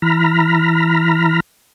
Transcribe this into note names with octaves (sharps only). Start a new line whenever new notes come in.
E3 A#5 B5 F6